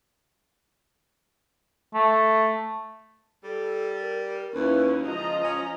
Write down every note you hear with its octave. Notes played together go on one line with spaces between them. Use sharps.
A3
G3 A4
A#4
D#2 C#4 E4 F4 B4
C#2 F3 F4 D#5 A#5
C#4